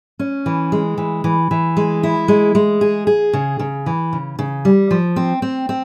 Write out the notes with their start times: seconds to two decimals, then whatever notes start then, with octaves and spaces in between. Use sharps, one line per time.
0.19 C#4
0.46 E3
0.72 G#3
0.98 E3
1.24 E3
1.51 E3
1.77 G#3
2.03 E4
2.28 G#3
2.55 G#3
2.81 G#4
3.07 G#4
3.33 C#3
3.59 C#3
3.86 E3
4.13 C#3
4.39 C#3
4.65 G3
4.91 F3
5.16 C4
5.42 C4
5.69 C4